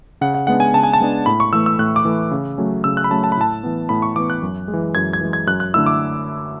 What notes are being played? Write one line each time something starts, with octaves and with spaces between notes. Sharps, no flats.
C#3 F#5
F#5
G#3 B3 D4 F#5
G#5
C#3 A5
G#5
A5
G#3 B3 D4
A2 B5
C#6
E3 A3 E6
E6
A2 F#6
D6
E3 A3
C#3
F#3 A3 C#4
C#3 E6
F#6
B5
F#3 A3 C#4 A5
A5
B5
A2 A5
E3 B3
A2 B5
C#6
E3 B3 D6
F#6
F#2
G#3
E3
F#2 G#6
G#6
E3 G#3
G#6
F#2 F#6
F#6
D3 A3 E4 E6
D6